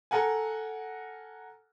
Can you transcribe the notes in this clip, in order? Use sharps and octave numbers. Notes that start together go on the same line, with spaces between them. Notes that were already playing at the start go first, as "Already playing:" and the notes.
A4 A#4 F#5 G#5